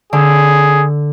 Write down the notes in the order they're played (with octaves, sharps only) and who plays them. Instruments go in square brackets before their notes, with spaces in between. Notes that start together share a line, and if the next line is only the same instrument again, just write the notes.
[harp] D3 [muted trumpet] G#4